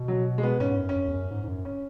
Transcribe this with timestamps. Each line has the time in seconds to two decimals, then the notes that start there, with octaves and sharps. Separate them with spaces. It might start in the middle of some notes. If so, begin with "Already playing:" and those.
Already playing: B2
0.08 F#3
0.38 G#3
0.43 B3
0.60 G#2 C#4
0.72 G#2
0.78 F#2
0.89 C#4
0.96 F#2
1.08 E2
1.13 F#2
1.30 G#2
1.44 G#2
1.48 F#2
1.65 C#4